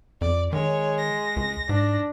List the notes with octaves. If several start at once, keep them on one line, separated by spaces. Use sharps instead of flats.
F2 D5
D#3 G#3 C#5
A#6
C#2
G#2 D4